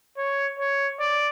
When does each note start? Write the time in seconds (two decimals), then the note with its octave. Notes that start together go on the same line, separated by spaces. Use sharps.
0.17 C#5
0.58 C#5
1.00 D5